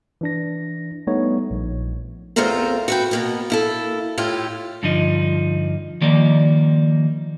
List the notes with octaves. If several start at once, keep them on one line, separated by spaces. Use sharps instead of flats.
E3 D4 A#6
G3 A3 B3 D#4 C#5
A#1
E2 A3 C4 F4 A#4 C5
F#4 B4 G5
B2 A#3 B3
A#3 E4 A4
A2 E4 F4 G4
G2 D3 F3 D#4
D#3 F3 G3 A#3 D5